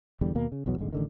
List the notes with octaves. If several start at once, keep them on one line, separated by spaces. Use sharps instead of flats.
E1 E2 D3 G3
D#2 B2 A#3
C#3
B1 E2 B2 F#3
D#1 G#1 D3 G#3
A1 D3 D#3